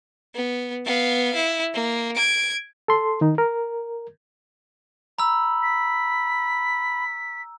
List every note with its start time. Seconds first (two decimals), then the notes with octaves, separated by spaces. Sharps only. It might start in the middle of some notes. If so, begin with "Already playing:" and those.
0.35 B3
0.85 B3 F5
1.35 E4
1.74 A#3
2.15 G#6 D7
2.88 A4 C6
3.21 D#3 D#4
3.38 A#4
5.19 A#5 B5 E6
5.63 B6